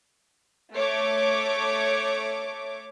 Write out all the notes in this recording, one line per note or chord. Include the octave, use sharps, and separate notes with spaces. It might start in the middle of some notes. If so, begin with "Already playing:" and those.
A3 C#5 D6